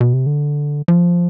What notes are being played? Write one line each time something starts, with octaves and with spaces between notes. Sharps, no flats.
B2
C3
D3
F3